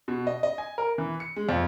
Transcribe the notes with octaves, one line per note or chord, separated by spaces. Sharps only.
B2
D#5
D#5
G#5
A#4
E3
C#7
G#3
F2